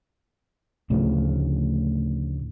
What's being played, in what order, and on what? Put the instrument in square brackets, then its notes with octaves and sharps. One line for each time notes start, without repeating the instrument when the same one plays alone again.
[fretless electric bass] D2 A2 C#3 F3